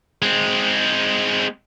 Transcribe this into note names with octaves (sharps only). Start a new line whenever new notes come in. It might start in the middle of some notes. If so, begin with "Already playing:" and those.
G#3 C4